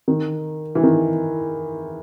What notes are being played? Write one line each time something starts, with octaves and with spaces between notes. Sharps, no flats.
D#3
E3
D#3